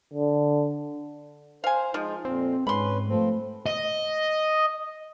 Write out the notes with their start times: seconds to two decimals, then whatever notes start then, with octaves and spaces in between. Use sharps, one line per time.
0.14 D3
1.64 C5 F5 G#5
1.94 F3 G#3 D#4 F4
2.25 F2 A#2 C4
2.67 G#2 C#4 B4 B5 C6
3.09 F3 A3 C4
3.66 D#5